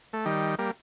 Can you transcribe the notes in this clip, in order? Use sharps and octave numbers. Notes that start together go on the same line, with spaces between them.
A3
D#3 G3
G3 A#3